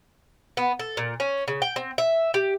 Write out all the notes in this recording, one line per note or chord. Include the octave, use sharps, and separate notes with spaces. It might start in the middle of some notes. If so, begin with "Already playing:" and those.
B3
A4
A#2
C#4
C#3
G5
C4
E5
G4